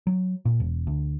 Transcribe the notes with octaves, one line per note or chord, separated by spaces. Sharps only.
F#3
A#2
E1
D2